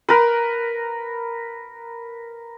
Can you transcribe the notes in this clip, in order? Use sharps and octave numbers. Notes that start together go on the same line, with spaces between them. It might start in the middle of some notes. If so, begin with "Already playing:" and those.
A#4 B4